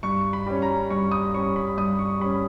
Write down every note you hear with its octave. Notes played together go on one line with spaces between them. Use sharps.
G2 C#6
B5
G3 C#4
A#5
G2 C#6
D#6
G3 C#4 C#6
B5
G2 D#6
C#6
G3 C#4 B5